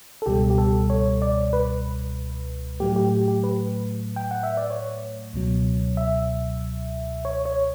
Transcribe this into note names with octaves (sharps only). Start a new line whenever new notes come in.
A4
C#2 B2 G3 G4
G4
A4
C#5
D5
B4
A2 F#3 A3 G4
G4
G4
B4
G5
F#5
E5
D5
C#5
C#2 B2 F#3
E5
C#5
C#5